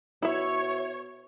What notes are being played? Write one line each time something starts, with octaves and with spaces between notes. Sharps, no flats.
B2 E4 C#5 E5